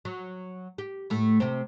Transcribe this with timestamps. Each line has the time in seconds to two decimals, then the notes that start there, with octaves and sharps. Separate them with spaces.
0.05 F#3
0.78 G4
1.10 A2 A3
1.40 C3 A3 C4